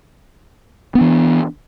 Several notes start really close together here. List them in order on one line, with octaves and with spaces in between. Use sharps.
B3 D4 E3